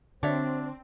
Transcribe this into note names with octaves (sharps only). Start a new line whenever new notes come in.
D3 C4 D4 F#4 C#5 E5